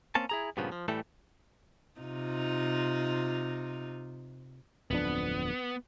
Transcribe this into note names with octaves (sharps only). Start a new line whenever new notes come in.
A#3 C4 C#4 A5
E4 G#4 A#5
G2 A#2 C#3 F3 B3
F3
A2 E3 G3 A3 A4
C3 D#4 F4
D1 F2 B3 D4